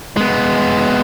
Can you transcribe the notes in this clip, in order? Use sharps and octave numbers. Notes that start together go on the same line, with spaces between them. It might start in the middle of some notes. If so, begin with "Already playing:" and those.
G#3 B3